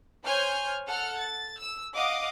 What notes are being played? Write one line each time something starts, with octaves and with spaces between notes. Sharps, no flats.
C5 C#5 G#5 F6 G6
A4 F#5 F6
A6
E6
D#5 F5 F#5 D6 D#6